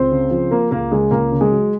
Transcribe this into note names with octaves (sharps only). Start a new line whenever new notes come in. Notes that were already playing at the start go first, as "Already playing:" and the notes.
Already playing: C#2 C4 C5
C#3
F3
A#3 A#4
C#2 A#3 A#4
C#3 G#3 G#4
C#2 A#3 A#4
C#3
G#3 G#4
F#3